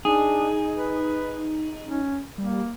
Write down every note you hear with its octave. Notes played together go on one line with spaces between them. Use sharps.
D4 D#4 G#4
B4
C#4
G3 A#3